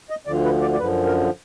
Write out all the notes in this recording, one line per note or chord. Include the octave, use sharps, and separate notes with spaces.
D#5
D2 D3 F3 D5
B4
D5
D5
F#2 D3 F3 B4
A#4